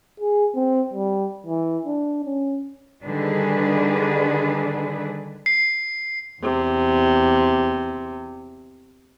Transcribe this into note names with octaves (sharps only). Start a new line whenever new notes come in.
G#4
C4
G3
E3
D4
C#4
D3 D#3 G3 D4 G#4 B4
C7
E2 C3